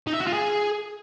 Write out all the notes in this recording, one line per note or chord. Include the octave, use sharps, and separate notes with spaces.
D#4
E5
F#4
F4
G#4